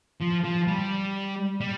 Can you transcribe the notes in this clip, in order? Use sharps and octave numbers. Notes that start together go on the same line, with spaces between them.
F3
F3
G3
G3